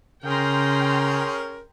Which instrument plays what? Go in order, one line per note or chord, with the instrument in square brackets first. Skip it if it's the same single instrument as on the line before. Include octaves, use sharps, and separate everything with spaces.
[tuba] C#3 [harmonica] C#4 G#4 A#4 [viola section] G5 A#5 C6